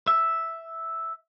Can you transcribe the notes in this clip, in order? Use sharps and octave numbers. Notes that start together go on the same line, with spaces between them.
E5